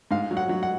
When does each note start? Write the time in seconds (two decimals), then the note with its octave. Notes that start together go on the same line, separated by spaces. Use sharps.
0.11 G#2 F5
0.31 F#3
0.37 F#5
0.49 F#3
0.63 F#5